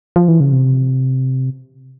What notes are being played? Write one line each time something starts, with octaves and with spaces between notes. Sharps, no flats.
F3
E3
C#3
C3